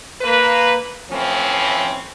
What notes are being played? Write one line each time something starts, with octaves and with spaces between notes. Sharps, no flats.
A#3 B4
A2 E3 F3 C4 C#4